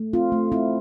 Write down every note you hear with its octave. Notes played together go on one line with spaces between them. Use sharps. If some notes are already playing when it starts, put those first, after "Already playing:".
Already playing: A3
C4 F4
A3
C4 E4